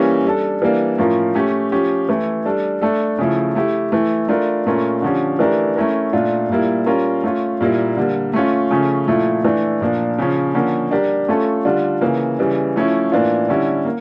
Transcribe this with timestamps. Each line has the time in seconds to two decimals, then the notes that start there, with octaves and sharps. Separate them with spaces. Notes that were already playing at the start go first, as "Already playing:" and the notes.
Already playing: E3 G3 A#3 C#4 G4
0.24 G3 D4 A4
0.62 E3 G3 A#3 D4
0.98 A2 F3 C#4 F4 A#4
1.35 A3 C#4 G4
1.72 F3 C#4 G4
2.09 E3 A3 E4
2.45 G3 D4 A4
2.82 A3 D4 A4
3.18 C#3 F3 A3 E4
3.55 A3 E4 G4
3.92 E3 A3 E4
4.29 A3 D4 F4 A#4
4.66 A#2 A3 C#4 F4 A#4
5.02 D3 F3 C#4 G4
5.39 E3 A3 D4 G4 A#4
5.76 A3 C#4 E4 A#4
6.13 A#2 A3 D4 F4
6.50 A#2 G3 A#3 E4
6.86 G3 C#4 F4 A#4
7.24 A3 C#4 F4
7.61 A#2 G3 A#3 E4
7.97 D3 G3 A#3
8.33 A3 C#4 F4
8.71 C#3 F3 A3 C#4
9.07 A#2 F3 A3 E4
9.44 E3 A3 D4
9.81 A#2 F3 A#3 D4
10.18 C#3 F3 C#4
10.54 D3 F3 A#3 C#4
10.91 G3 D4 G4 A#4
11.28 A3 C#4 F4 A4
11.65 D3 G3 D4 F4
12.01 C#3 E3 A#3
12.39 C#3 E3 G3
12.76 F3 A3 C#4 E4
13.12 A2 E3 A#3 D4 F4
13.49 D3 G3 C#4 E4
13.85 A#3